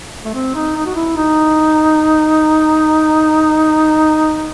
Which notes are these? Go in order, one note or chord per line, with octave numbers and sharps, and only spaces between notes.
A3
C4
D#4
D#4
F#4
E4
D#4